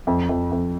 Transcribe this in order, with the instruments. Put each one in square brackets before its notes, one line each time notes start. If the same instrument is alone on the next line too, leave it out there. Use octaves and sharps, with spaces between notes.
[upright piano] F2
F2
F2